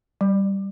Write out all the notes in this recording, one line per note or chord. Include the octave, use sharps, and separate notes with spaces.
G3